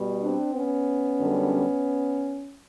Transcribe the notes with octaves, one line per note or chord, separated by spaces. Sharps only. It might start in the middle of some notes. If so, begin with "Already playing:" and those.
Already playing: B2 G3
C4 D4
B3 C#4
F#2 D3 G3